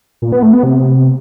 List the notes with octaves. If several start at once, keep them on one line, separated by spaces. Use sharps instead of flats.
A#2
B3
A3
B3
C3